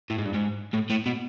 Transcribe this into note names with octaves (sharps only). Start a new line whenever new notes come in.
A2
G#2
G2
G#2
A2
A2
B2